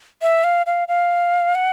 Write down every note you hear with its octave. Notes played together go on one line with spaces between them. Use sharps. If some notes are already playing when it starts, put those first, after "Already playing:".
E5
F5
F5
F5
F#5